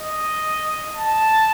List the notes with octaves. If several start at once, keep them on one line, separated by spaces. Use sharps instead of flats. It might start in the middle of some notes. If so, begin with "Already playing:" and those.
Already playing: D#5
A5